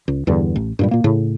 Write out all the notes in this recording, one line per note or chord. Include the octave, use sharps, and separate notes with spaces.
C#2
E2 G2 D3
A1
G2 A#2 G3
A#2 A#3
A2 C#3